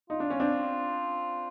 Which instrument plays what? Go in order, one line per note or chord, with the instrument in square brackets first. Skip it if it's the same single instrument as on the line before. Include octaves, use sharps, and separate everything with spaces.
[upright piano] D#4 [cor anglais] F4
[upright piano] D4
C#4
C4 D4